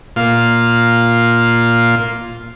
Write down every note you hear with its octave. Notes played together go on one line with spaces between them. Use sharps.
A#2 F4